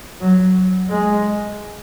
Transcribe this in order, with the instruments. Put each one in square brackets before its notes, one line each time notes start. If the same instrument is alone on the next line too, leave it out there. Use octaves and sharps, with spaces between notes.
[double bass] F#3
G#3